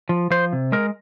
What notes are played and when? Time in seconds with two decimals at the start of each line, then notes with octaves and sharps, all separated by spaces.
0.09 F3
0.30 F3 C5
0.53 C3
0.72 G#3 A#4